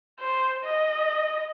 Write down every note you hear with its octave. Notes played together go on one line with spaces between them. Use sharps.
C5
D#5